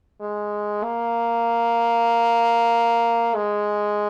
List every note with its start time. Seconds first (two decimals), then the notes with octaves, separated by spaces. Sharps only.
0.21 G#3
0.83 A#3
3.35 G#3